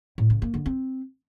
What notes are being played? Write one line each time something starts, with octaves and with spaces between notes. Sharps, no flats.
A2
C#3
A#3
D3
C4